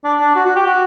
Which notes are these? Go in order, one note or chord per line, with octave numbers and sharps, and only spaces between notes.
D4
D4
F#4
F#4
G4
F#4